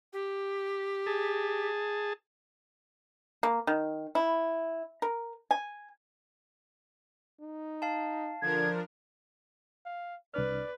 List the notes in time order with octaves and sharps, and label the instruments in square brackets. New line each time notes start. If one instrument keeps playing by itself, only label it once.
[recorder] G4
[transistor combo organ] G#4 A5
[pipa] A#3
D#3
E4
A#4
G#5
[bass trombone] D#4
[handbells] F5 A5
[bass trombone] D3 [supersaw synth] F3 D4 A#4 [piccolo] G#6
[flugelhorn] F5
[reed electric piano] C2 D4 F6 [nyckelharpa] B4 [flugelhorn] D5